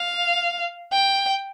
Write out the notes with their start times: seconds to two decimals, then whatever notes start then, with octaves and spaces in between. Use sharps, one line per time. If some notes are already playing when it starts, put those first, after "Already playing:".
Already playing: F5
0.93 G5